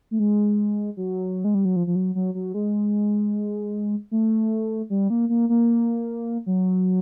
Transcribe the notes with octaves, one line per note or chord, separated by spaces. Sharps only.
A3
G#3
F#3
G#3
G3
F#3
F3
F3
F#3
F#3
F#3
G#3
A3
G3
A#3
A#3
A#3
F#3